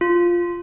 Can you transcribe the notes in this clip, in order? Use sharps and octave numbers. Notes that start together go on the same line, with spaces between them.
F4